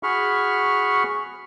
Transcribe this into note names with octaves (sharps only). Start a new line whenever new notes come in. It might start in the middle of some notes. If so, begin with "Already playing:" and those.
F#4 G#4 B5 C#6 F6